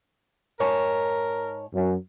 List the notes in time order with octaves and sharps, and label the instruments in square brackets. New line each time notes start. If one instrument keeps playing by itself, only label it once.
[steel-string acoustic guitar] G#2 C#5 A5 [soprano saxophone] A#4
[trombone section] F#2